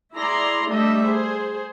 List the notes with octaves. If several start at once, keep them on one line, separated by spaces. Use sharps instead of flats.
E4 G#4 D5 A#5 C6
G3 A3 D4 D#5 E5
G#4 C5